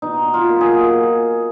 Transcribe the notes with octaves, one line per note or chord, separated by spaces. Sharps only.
B2 D#4
F4
F#3 A#3
G#4